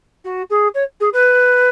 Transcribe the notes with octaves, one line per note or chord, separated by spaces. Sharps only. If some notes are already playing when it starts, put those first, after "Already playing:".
F#4
G#4
C#5
G#4
B4